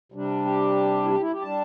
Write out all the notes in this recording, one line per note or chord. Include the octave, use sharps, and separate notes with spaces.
C3 G3 D4
G4
E4
G4
E4
G4
G3 D4 A5